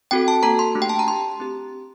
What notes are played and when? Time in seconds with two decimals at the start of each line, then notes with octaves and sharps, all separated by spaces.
0.11 C4 F#4 A4 G5
0.28 A5
0.43 A#3 F#4 A4 A#5
0.59 C6
0.75 A3 D4 G4
0.82 G5
0.89 A5
0.99 A#5
1.07 D4 G4 C6
1.40 C4 G4